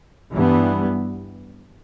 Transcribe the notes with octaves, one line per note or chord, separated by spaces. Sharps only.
G2 E3 G3 B3